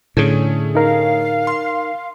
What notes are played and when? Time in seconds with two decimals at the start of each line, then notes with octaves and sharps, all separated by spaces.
0.17 A2 D3 A3 C#4 G#4
0.75 D#4 A#4 F5
1.47 C6